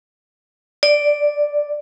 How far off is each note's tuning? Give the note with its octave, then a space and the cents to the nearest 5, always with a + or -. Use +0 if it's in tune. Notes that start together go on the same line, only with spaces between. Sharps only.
D5 +0